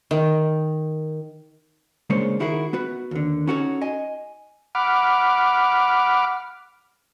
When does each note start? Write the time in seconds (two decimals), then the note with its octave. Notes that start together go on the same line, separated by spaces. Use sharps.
0.11 D#3
2.10 C#3 G#3 A#3 D4 C5 C#5
2.40 D#3 D#4 E4 F#4 G#4 A#4
2.73 B3 F#4 B4
3.11 D#2 D3
3.47 C#4 D#4 F#4 A4 A#4 C#5
3.82 D#5 G#5
4.75 F#5 B5 D6 F6